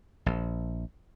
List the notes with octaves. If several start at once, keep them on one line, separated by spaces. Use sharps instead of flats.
A#1